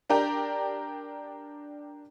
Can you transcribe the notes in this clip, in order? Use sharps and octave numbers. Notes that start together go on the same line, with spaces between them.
D4 G4 A#4 D5 G5 A#5